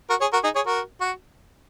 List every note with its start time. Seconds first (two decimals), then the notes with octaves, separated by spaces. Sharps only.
0.10 F#4 A#4
0.21 G#4 C#5
0.33 F#4 A#4
0.44 D#4 G#4
0.55 G#4 C#5
0.67 F#4 A#4
1.01 F#4